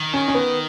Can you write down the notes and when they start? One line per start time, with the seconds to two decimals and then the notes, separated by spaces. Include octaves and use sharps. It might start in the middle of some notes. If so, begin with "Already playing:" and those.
Already playing: D#3
0.14 C#4
0.28 C#4
0.34 B3